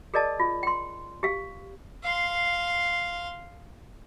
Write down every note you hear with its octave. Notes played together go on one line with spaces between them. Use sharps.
G#4 A#4 D5 D#5 A5
F4
G5 C6
G4 F5
F5 C6